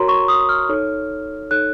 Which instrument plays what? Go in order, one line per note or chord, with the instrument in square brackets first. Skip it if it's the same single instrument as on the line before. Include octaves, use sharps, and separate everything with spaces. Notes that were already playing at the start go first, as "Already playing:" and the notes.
Already playing: [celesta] F#4 A#4 C#5 A#5 C6
C#6
D#6
F6
D#4 A4 C#5
D#4 A4 C#5 F#6